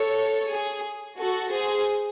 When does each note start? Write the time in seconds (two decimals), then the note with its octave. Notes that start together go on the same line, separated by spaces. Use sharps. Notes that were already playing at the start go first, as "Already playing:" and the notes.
Already playing: A4 C#5
0.51 G#4
1.18 F#4 A4
1.52 G#4 C5